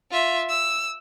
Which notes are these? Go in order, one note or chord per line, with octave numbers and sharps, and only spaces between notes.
F4 E5
E6